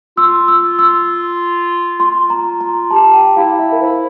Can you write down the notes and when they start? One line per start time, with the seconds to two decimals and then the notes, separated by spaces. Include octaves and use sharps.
0.17 F4 E6
0.48 E6
0.79 E6
2.00 F4 C6
2.30 A#5
2.61 A#5
2.91 G4 A5
3.14 G5
3.37 E4 F5
3.59 E5
3.72 A#4
3.81 E4 C5